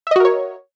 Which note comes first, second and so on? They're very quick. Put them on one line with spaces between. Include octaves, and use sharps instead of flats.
E5 D#5 F#4 A#4 C#5